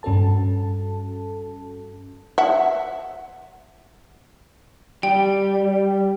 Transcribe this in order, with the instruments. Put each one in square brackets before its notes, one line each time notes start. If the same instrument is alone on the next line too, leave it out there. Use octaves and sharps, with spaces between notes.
[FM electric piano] G2 C#4 F#4 A4 A5
[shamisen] E5 F#5
[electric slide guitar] G3 [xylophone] G5